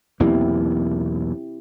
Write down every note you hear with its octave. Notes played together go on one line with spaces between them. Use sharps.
B1 E2 A#3 C4 E4 G4